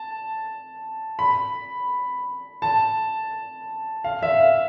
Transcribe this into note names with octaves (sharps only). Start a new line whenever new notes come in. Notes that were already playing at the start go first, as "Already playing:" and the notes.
Already playing: A5
B5
A5
F5
E5
F5